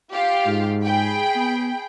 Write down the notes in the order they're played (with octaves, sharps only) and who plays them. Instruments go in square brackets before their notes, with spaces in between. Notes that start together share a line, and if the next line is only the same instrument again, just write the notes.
[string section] F4 G4 F5
[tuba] G#2
[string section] G#4 G5 B5
[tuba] B3